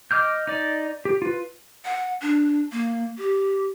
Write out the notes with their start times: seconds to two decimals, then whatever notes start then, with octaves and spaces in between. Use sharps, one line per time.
0.11 D#5 D6 F6 G6
0.47 D#4 D5
1.05 G4
1.22 F4 B4
1.85 F#5
2.22 D4
2.72 A#3
3.18 G4